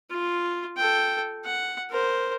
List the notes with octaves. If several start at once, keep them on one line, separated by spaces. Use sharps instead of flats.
F4
A4 G5
F#5
A#4 C5